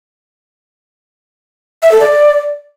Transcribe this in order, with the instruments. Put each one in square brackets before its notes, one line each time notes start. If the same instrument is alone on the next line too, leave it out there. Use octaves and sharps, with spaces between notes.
[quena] E5
A4
D5